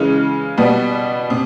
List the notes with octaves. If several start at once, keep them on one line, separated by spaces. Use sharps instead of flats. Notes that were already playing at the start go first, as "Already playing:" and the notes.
Already playing: C#3 E3 G#3 C#4
B2 G3 B3
C3